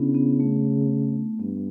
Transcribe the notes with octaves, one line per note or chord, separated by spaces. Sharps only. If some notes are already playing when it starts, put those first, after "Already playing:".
Already playing: C#3 B3 C#4 D4 E4
B3
A3
G2 B3